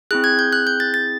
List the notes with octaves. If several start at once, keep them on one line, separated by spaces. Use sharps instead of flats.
C4 E4 G#4 F#6
G#6
G6
F#6
G6
A6
A6